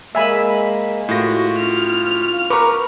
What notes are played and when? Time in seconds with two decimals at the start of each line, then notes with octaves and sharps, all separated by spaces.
0.15 G#3 A#3 E5 G#5 B5
1.09 A2 F4 F#4 A#6
1.58 F6
2.50 A#4 B4 A#5 C#6 D6